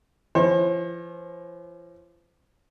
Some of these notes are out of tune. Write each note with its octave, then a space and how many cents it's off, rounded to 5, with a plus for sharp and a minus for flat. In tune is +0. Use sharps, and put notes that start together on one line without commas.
F3 -40 C5 +45